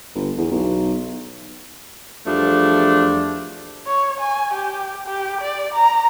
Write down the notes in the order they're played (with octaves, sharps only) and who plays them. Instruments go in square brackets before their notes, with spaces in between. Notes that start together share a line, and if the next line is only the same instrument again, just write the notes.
[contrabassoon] G1
E2
B1
[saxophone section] E2 F3 G3 A3 D4
[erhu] C#5
G#5
G4
G4
D5
A#5